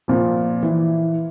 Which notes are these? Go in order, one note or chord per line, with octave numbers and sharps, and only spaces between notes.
A#2 F3
E3